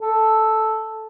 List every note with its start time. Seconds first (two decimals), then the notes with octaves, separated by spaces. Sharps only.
0.01 A4